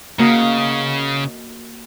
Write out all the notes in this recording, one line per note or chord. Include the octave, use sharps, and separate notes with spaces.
C#3 A#3 F#4 D#5